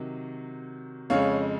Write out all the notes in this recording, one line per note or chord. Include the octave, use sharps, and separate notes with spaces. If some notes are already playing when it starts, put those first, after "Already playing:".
Already playing: C3 D#3 F#3
F2 C#3 G#3 C#5 F5